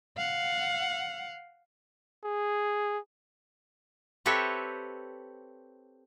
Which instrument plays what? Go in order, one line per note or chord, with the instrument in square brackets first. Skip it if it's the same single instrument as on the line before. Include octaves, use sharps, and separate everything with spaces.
[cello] F5 F#5
[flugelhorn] G#4
[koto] C4 G4 A4 B4 C#5 E5